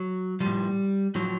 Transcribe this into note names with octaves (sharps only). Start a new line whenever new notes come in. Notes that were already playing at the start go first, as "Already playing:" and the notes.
Already playing: F#3
F3 G3
A2
A2 F3 F#3